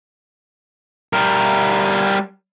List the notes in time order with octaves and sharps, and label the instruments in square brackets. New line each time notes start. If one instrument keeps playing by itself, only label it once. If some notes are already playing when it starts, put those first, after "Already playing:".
[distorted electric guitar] G3 A#4